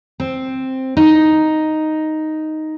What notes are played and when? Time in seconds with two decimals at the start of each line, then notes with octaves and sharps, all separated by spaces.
0.20 C4
0.97 D#4